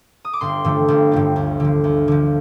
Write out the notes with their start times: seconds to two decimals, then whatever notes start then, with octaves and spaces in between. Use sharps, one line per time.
0.25 D#6
0.33 D6
0.41 G1 C6
0.64 G2 D3 F3 A3
0.88 G1
1.12 G2 D3 F3 A3
1.36 D2
1.60 D3 F3
1.84 D2
2.08 D3 F3